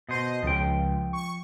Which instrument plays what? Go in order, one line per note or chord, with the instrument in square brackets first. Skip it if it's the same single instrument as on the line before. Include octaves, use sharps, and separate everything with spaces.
[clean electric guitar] B2 C5 [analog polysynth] D#5
[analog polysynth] C#2 [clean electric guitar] F3 G5
[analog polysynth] C#6